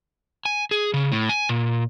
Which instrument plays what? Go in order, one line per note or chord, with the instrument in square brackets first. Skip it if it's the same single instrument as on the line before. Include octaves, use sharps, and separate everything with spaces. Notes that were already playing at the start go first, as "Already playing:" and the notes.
[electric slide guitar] G#5
G#4
C#3
A2
G#5
A#2